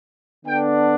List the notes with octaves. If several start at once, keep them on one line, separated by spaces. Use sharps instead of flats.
D3 B3 D4 G5